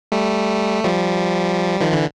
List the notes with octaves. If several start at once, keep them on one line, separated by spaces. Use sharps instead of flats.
G3 A3
F3 G3
D#3 F3
D3 E3